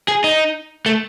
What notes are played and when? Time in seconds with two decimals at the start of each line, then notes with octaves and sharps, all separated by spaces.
0.08 G#4
0.24 D#4
0.86 A3